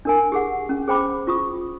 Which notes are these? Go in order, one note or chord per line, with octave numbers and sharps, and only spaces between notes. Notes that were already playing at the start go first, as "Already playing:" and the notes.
D4 A#4 G#5
G4 G#4 F#5
C#4
G#4 C5 G5 B5 D6
F4 C#6 D#6